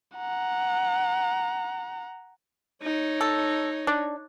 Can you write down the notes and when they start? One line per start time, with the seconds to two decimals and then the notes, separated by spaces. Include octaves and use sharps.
0.17 F#5 A#5
2.82 D#4 C#5
3.21 A4
3.87 D4